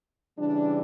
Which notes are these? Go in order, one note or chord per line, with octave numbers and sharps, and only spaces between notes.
C#3 E3 G3 D4